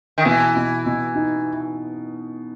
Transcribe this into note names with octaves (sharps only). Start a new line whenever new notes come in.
D#3
B2 E3
B2
B2
D#4